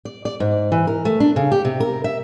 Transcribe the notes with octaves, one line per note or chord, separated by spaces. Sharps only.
D5
D5
G#2
E3
A#4
A3
D4
C#3
G4
C3
A#4
E5